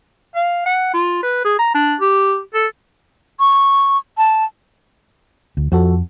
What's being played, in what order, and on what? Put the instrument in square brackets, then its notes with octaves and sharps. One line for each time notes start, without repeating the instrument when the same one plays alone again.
[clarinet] F5
F#5
F4
B4
G#4
A#5
D4
G4
A4
[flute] C#6
A5
[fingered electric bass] D2
[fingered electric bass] F2 [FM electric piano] F3 F#4 A4